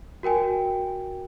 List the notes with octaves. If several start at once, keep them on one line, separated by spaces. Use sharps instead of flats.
F#4 A#4 G5 G#5